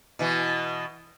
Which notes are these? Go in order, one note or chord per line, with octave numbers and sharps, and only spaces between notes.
B2 E3